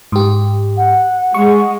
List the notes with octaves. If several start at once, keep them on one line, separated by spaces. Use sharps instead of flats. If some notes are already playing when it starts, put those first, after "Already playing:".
G#2 G4
F#5
G#3 C#6